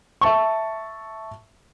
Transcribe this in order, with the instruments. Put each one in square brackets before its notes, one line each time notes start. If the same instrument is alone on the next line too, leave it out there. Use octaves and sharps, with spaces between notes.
[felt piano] E5 A5 C#6